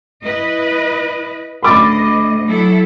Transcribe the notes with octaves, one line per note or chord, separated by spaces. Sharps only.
E4 B4 D#5
D2 D#5 B5 D6 A6
F#3 E4 A4